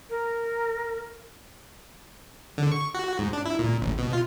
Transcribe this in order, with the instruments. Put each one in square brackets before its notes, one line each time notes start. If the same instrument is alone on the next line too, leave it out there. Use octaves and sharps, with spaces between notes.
[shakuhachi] A#4
[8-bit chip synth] D3
C#6
F#4
G#2
D4
E4
A#2
A1
B2
F4